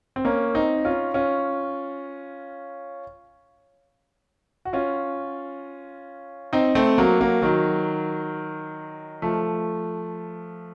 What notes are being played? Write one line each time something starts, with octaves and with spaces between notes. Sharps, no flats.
C4
A#3 C#4
C4 D#4
C#4 F4
C#4 F4
F#4
C#4 F4
C4 D#4
A3 C4
F#3 A#3
F#3 A#3
D#3 F#3
F3 A3